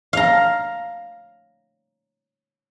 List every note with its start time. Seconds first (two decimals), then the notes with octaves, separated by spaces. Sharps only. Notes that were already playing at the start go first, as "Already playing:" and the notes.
0.13 F5 A#5